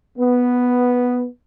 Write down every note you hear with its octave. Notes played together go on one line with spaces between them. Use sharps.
B3